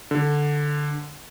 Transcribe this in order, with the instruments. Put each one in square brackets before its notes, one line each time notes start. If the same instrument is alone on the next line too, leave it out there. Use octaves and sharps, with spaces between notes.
[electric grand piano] D3